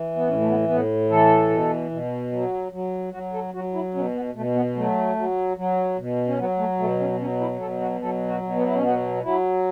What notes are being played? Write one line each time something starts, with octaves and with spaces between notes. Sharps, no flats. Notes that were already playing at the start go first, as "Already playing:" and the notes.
Already playing: E3
B3
A2 C#4
A3
B3
A2 B3
E3 A4
B2
B2
F#3
F#3
F#3 F#4
A4
F#3 F#4
E4
B2 C#4
B3
B2 A3
B3
F#3 A3
F#3
F#3
B2
C#4
F#3 B3
A3
B2 A3
C#4
F#3 C#4
E4
B2 A4
F#4
F#3 A4
F#4
B2
B3
E4
C#4
F#3 B3
F#3 E4